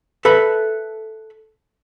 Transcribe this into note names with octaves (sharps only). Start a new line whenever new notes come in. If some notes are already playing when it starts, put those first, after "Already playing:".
A4 B4 E5 B5